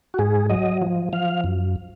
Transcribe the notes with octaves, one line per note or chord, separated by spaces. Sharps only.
F#4
G#2 G#4
F#3 D#5
F3
F3 F5
F#2